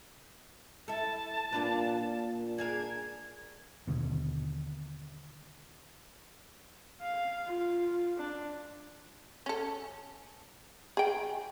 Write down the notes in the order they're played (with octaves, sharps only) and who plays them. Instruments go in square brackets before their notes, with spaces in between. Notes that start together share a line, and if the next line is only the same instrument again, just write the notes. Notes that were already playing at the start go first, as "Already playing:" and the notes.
[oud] E4 A4 [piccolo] A5
[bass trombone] A#2 [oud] A#3 D4 B4
[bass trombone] A#2
[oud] D4 G#4 A#4 [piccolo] G#6
[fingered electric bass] D#2 B2 D3
[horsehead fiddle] F5
F4
D4
[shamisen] C#4 A4
G#4 G5